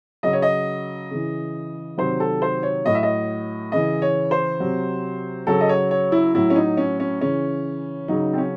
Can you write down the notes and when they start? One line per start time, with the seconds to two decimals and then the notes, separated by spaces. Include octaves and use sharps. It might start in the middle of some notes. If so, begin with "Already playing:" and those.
0.23 C#3 F#3 D#5
0.33 C#5
0.42 D#5
1.10 C#3 E3
1.98 C3 D#3 F#3 C5
2.20 A4
2.42 C5
2.63 C#5
2.85 A2 F#3 D#5
2.95 E5
3.03 D#5
3.72 C#3 E3 D#5
4.02 C#5
4.31 C5
4.60 C3 F#3
5.47 C#3 F#3 A4
5.61 D#5
5.69 C#5
5.91 C#5
6.12 E4
6.35 A2 F#3 E4
6.50 C#4
6.56 D#4
6.77 C#4
7.00 C#4
7.21 C#3 E3 C#4
8.08 C#3 F#3 D#4
8.33 C4
8.38 C#4